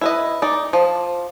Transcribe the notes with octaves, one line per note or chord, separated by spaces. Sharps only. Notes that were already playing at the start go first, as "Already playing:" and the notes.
E4 B4 D#5
D#4 D5
F3